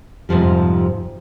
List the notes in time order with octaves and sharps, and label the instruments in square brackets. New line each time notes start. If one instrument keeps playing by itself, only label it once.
[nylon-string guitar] F2 G#2 C3 F3 G3